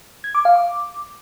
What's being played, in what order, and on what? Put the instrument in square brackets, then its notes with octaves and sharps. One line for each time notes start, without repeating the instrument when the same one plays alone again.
[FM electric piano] G#6
D6
F5
D6